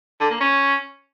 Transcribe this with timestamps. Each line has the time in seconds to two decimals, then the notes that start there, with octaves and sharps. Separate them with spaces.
0.20 D3
0.30 A#3
0.40 C#4